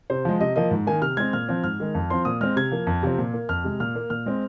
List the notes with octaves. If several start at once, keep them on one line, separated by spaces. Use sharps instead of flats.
C3 C5
F3 G#3
C3 D#5
F3 A#3 D#5
G#2
D#3 A#3 G#5
C3 F6
G#3 C4 G#6
A#2 F6
F3 C4
G#2 F6
D#3 G#3
F2
F3 C4 C6
A#2 D#6
G#3 C4 F6
C3 G#6
F3 A#3
F2
C3 F3 C4
A#2
A#3
F2 F6
C3 G#3
A#2 F6
A#3
A#2 F6
G#3 C4